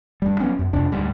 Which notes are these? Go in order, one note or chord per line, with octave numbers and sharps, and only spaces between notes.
G2 G3
F#3 B3 C#4
F#2
F2 C3 D4
D2 G#2 G3